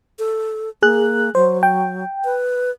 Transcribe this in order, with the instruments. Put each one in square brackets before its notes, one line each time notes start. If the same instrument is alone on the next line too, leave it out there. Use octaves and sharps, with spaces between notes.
[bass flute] A4
[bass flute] A#3 [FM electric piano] G#4 F#6
[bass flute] F#3 [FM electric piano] C5
[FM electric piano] G5
[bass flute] B4